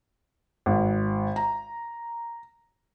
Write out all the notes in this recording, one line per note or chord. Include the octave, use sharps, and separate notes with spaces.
G#1
A#5